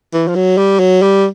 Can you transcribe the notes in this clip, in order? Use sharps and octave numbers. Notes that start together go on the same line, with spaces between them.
E3
F3
F#3
G3
F#3
G3